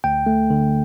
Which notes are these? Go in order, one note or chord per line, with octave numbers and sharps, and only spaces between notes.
D2 G5
A3
D3